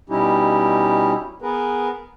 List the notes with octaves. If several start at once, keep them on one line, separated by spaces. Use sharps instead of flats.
B2 G3 C#4 D#4 E4 G4
B3 G#4 A#4 B4